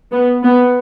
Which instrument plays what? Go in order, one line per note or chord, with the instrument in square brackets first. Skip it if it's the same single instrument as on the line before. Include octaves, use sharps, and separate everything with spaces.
[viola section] B3
B3